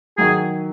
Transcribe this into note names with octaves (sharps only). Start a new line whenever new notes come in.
D#3 F#3 G#4